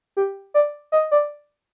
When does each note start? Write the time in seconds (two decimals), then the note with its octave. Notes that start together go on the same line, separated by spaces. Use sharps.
0.17 G4
0.54 D5
0.92 D#5
1.11 D5